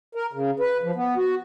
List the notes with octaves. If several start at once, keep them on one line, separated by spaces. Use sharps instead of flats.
A#4
C#3
B4
F3
B3
F#4